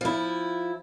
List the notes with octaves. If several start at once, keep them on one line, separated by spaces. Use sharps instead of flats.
F3 E4